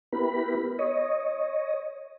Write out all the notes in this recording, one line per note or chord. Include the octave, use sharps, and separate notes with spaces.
B3 E4 G4 A#4 B4 B5
C#5 D#5